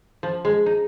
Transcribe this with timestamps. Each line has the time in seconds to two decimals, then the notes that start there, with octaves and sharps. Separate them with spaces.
0.23 F3
0.45 G#3
0.66 D#4